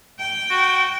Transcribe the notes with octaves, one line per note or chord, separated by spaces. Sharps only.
G5
F#4